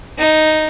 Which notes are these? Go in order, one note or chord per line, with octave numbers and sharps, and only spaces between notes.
D#4